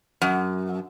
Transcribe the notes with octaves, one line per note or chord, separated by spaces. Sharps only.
F#2